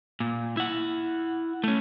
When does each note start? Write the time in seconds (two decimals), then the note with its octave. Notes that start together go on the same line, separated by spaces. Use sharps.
0.20 A#2
0.57 E4 F#5
1.64 A3 C#4